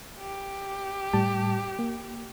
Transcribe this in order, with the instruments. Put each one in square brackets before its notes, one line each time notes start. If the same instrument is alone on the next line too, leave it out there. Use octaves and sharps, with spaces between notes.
[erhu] G4
[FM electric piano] A2 G3 A5
A#3